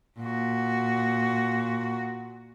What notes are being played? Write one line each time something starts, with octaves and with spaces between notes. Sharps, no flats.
A#2 F#4